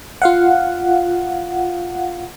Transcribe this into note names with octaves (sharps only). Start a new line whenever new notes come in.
F4 F5 F#5